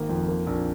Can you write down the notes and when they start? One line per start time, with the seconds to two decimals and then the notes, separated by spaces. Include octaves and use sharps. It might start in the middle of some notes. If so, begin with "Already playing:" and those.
Already playing: G#1 A#3
0.09 F2
0.28 A#3
0.47 A#1